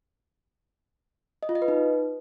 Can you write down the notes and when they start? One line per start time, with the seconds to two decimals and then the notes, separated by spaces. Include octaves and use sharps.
1.43 D#5
1.49 F4
1.55 D#5
1.62 B4
1.68 D#4